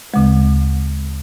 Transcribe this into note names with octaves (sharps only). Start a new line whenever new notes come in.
D2 C#3 G#3